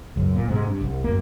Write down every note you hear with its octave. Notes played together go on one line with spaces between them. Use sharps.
C#2 F#2
A#2
G#2 C3 F#3 G#3
G2
C2
F#2 A#3